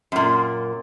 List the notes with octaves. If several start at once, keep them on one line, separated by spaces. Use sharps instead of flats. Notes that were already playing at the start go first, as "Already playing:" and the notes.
F#2 A#2